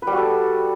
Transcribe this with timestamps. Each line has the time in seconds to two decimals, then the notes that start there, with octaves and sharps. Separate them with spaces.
0.02 B4
0.07 G3
0.12 F#4
0.17 A4